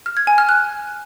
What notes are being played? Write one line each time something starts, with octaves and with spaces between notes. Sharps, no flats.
F6
G#6
G#5
F6
F#6